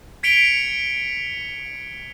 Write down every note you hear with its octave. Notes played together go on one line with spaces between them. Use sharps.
G#6 B6 C#7 D7 F7 G7